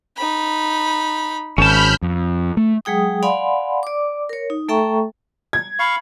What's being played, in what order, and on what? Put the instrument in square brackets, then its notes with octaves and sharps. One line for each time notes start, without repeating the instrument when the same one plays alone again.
[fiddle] D#4 B5
[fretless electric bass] G#1 [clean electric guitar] C#4 A5 [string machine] B5 F6 G6 [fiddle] E6
[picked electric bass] F2
A3
[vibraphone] F#3 G#3 G#4 G5 D#6
D5 F5 F#5 G#5 B5 C6
D5 D6
A#4 C#5
D#4
A3 A4 E5 G5 A#5 C#6
[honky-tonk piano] G#6
[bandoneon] F5 C#6 [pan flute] B5